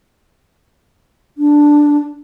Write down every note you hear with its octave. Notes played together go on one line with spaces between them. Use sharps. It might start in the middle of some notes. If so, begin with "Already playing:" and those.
D4